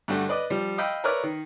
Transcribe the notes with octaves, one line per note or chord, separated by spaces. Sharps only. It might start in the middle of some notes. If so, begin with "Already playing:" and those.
G2 D3 A3 F#4
B4 D5 D#5
F3 G3
D#5 F5 G5 B5 E6
A#4 B4 C#5 D5 E5 F6
D#3